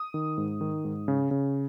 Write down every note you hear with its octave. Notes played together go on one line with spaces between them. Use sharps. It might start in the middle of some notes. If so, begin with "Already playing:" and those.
Already playing: D#6
D#3
G#2
D#3
G#2
C#3
C#3